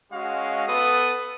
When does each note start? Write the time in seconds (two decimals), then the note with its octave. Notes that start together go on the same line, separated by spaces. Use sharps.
0.11 G#3 C#4 F#4 D#5 F5
0.67 B3 A4 B4 D#6